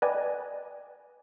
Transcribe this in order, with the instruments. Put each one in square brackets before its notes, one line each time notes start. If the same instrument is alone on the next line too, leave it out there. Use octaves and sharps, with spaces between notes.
[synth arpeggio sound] B4 D5 D#5 G5 G#5